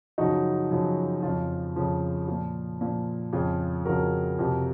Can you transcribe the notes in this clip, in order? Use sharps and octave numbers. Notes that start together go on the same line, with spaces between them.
F#2 C#3 F3 D#4 F#4
F#2 C#3 F3
F2 C#3 F3 F4
F2 C#3 F3
A#2 F3 F4
A#2 F3
F2 C#3 F3 F4 G#4
F2 C#3 F3 F#4 A#4
F2 C3 F3